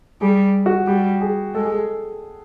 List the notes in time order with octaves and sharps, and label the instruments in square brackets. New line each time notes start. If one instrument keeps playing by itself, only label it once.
[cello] G3 [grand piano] G#4
[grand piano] F#4
[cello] G3 [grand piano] G4
[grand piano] G#4
[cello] G#3 [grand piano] A4
[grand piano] G#4
A4